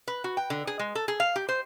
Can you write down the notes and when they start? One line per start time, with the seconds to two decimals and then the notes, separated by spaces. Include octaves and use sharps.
0.08 B4
0.24 F#4
0.37 G5
0.50 D3
0.67 G#4
0.79 G#3
0.95 A4
1.08 G#4
1.20 F5
1.36 G4
1.49 C5